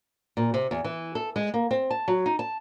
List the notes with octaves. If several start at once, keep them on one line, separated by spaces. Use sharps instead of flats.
A#2
C3
E2
E3
A4
G#3
A#3
C4
A5
F#3
D#4
A5